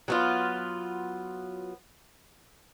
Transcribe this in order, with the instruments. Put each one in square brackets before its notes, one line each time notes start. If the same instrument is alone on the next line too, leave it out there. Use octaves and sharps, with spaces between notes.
[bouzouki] F#3 B3 F4